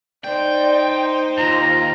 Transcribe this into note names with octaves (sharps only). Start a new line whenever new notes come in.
D#4 C5 D5 G5
D#2 F4 A#5